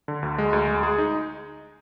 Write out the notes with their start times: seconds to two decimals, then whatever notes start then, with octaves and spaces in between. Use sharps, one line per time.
0.08 D3
0.23 D2
0.38 G#3
0.53 D2
0.68 G#3
0.83 G#4
0.98 D#4